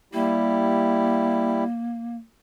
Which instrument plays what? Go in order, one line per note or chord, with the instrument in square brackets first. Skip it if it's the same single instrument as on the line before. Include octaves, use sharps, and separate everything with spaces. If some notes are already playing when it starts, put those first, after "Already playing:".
[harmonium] G3 E4 G4 [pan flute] A#3